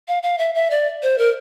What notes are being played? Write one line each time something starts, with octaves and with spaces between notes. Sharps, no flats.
F5
F5
E5
E5
D5
C5
A#4